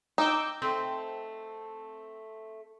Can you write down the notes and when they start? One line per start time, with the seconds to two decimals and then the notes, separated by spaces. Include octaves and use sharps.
0.18 D#4 G5 D6 E6
0.62 A3 C4